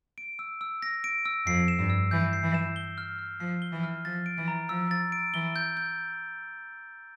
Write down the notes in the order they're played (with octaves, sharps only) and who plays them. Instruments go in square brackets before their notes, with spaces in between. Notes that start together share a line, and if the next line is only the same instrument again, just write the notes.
[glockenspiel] D7
E6
E6
A#6
D7
E6
[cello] F2 [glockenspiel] C7
[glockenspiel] E7
[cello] G2
[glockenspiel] E6
[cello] E3 [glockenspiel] G6
[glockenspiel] C7
[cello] E3
[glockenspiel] E7
G7
F6
F6
[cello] F3 [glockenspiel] C7
[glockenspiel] G7
[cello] E3
[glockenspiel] F6
[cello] F3 [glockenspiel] A6
[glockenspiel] D7
[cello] E3
[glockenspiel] A#5
[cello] F3 [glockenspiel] E6
[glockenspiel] A6
D7
[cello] E3 [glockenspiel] G7
[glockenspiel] G6
G6